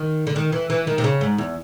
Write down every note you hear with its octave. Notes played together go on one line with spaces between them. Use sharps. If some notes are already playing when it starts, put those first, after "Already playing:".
Already playing: D#3
D3
D#3
E3
E3
D#3
C3
C#3
G#2
E2